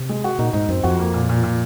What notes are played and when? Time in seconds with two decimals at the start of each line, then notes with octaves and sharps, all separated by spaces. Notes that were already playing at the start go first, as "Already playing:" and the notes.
Already playing: C3
0.09 G#3
0.24 F#4
0.39 A#2 D#4
0.53 G#2 D#4
0.69 F#2 C4
0.84 F2 F#4
0.99 A#3
1.14 A#2
1.29 A#2
1.43 A#2